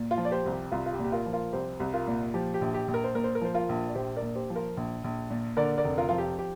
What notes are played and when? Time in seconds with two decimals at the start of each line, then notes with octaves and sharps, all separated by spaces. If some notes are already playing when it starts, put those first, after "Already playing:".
Already playing: A#2
0.11 F4
0.18 F3
0.25 D5
0.31 G4 C5
0.46 C2
0.52 G4
0.72 C2 F4
0.86 F4
0.93 G4
0.99 A#2
1.04 G4
1.12 F4 A#4
1.26 F3
1.33 F4 A#4
1.52 C2 G4 C5
1.80 C2
1.94 F4 A#4
2.07 A#2
2.34 F3 G4
2.54 G4
2.61 A#1
2.74 G4
2.88 A#1
2.94 A#4
3.04 C5
3.15 A#2 A#4
3.24 C5
3.35 A#4
3.41 F3 C5
3.54 F4 A#4
3.69 A#1
3.89 D5
3.95 A#1 G4 C5
4.16 A#4 D5
4.22 A#2
4.35 G4 C5
4.50 F3
4.56 F4 A#4
4.77 A#1
5.04 A#1
5.30 A#2
5.57 D3 A#4 D5
5.78 A#4 D5
5.85 F1
5.98 F4 A#4
6.09 F3 F4
6.18 G4
6.39 G4